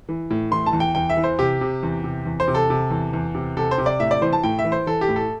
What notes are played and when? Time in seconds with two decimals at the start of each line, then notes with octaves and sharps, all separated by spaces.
0.09 E3
0.30 A2
0.51 E3 C6
0.66 A5
0.73 E2
0.80 G5
0.95 E2 G5
1.10 E5
1.17 E3
1.24 C5
1.39 C3 G4
1.61 C3
1.83 E2
2.04 C3
2.26 E2
2.40 C5
2.48 C3
2.55 A4
2.70 C3
2.91 E2
3.13 E2
3.35 C3
3.57 C3 A4
3.71 C5
3.78 C3
3.86 D5
4.00 A2 E5
4.11 D5
4.21 E3 C5
4.33 A5
4.43 A2 G5
4.59 E5
4.65 E3
4.72 C5
4.87 E3 A4
5.01 G4
5.08 A2
5.16 A4